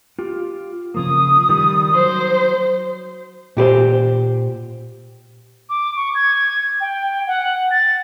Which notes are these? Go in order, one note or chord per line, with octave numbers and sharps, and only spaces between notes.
F4 G4
C#3 F3 A#3 D#6
D#3 G3
F#3 C5
A#2 G4 B4 C5
D6
C#6
G#6
G5
F#5
A6